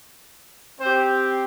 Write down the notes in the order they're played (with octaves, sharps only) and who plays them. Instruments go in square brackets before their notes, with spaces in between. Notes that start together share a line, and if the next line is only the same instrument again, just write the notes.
[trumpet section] C4 G4 C5